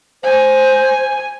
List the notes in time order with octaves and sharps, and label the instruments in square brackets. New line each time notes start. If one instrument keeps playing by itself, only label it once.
[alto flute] C5 [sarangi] G#5